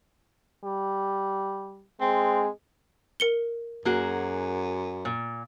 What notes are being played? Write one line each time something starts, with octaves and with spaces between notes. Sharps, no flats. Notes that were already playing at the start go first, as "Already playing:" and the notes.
G3
G#3 C4
A#4 C#7 G7
F#2 A#3 F#4 G#4
A#2